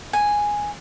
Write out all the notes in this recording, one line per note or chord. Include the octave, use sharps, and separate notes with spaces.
G#5